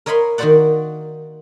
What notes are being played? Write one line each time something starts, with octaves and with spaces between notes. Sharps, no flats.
A#4 C#5 D#5 F5 B5 C6
D#3 A#3 F#4 C5 D5 F#5